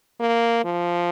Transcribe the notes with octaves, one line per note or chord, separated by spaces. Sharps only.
A#3
F3